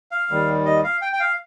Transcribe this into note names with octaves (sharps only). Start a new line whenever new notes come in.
F5
D#2 D#3 G3
D#5
F5
G5
G5
F5